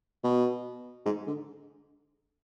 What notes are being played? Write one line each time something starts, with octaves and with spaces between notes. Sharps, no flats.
B2
G#2
D3